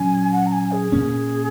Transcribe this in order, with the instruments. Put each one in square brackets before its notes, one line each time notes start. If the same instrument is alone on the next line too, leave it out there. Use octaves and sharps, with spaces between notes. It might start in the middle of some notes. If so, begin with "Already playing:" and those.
Already playing: [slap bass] A#2 F#3 C#4 [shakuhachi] G#5
[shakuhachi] F#5
A#5
G#5
G#4
[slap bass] A#2 A#3 C#4